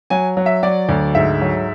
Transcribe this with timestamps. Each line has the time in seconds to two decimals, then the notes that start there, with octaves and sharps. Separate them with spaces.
0.10 F#3 G#5
0.37 F#3
0.46 E5
0.63 F#3 D5
0.89 D2
1.15 G#2 E5
1.41 F#3